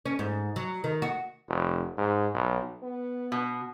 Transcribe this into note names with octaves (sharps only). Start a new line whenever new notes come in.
C#4
G#2
F#3
D#3
F#4
F1
G#2
B1
B3
B2